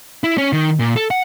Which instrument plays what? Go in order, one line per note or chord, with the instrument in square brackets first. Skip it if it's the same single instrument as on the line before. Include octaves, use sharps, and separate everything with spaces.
[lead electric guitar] E4
C#4
D#3
A#2
A4
F#5